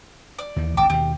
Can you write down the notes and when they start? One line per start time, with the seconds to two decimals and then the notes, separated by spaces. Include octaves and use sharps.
0.39 D5
0.56 D#2 D#3 E3
0.77 G#1 D2 G5 A5 D6
0.90 D#2 B2 G4